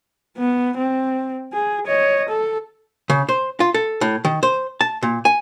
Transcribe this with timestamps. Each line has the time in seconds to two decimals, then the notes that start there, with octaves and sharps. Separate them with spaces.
0.38 B3
0.77 C4
1.53 G#4
1.87 C#5 D#5
2.29 A4
3.10 C#3
3.29 C5
3.60 F4
3.74 A4
4.01 A2
4.25 D#3
4.43 C5
4.81 A5
5.03 A#2
5.25 G#5